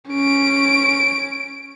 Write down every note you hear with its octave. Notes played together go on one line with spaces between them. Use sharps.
C#4 D7